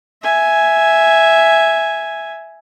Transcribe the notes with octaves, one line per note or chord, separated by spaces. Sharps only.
E5 G#5